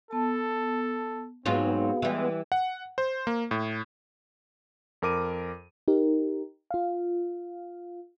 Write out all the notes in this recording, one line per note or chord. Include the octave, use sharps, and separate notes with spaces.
B3 A4 A5
G#2 F#3 B3 C4 F4 F#4 G#4 F5
E3 G3 G#3
F#5
C5
A#3
A2
F2 A#4 D6 D#7
D#4 G4 A#4
F4 F5